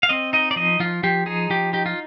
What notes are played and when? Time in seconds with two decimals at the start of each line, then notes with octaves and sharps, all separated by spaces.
0.03 F5
0.09 C4 D#5
0.33 D#4 D#5
0.51 D5
0.56 F3 D#5
0.80 F3 F4
1.03 F3 G4
1.26 D#4 G#4
1.50 F3 G4
1.73 D#4 G4
1.86 F4